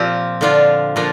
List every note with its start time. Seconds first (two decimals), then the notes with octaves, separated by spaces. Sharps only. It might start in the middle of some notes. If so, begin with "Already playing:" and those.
Already playing: A#2 F3 C4 G4
0.41 D3 F3 D4 F4
0.96 A#2 F3 D4